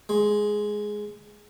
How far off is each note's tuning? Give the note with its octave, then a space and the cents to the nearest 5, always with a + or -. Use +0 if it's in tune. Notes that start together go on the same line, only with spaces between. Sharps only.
G#3 +5